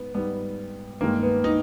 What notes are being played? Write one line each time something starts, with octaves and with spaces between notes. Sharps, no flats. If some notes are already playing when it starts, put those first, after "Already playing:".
Already playing: G#2 B3
G#2 G3 B3
G2 D#3 G#3 A#3
B3
D#4